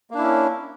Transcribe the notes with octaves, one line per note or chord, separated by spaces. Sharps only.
A#3 C#4 D4 E4